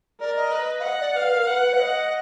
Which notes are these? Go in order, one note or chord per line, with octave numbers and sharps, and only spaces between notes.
A#4 D5
D#5
B4
F5
D#5 F#5
D5
B4 F5
A#4
B4 F#5
B4
F5
D#5